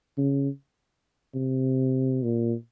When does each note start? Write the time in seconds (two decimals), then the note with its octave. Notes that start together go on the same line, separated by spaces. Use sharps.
0.18 C#3
1.35 C3
2.23 A#2